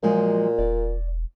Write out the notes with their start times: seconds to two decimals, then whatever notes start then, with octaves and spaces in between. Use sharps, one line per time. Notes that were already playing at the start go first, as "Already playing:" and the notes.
0.03 A#2 F3 F#3 G#3
0.58 E1 D5